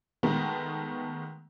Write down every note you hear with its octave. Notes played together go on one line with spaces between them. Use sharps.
D#3 G#3 A3 B3